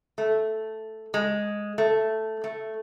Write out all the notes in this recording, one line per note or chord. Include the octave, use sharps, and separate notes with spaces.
A3
G#3
A3
A3